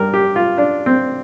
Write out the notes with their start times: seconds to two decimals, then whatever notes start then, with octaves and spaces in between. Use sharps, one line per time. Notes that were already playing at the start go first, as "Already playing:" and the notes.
Already playing: G2 G3 A#4
0.14 G4
0.36 F4
0.58 D4
0.86 C4